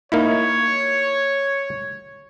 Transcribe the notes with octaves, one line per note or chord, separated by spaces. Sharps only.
A#3 D#4 E4 C#5